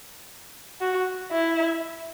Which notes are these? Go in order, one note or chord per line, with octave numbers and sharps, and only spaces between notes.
F#4
E4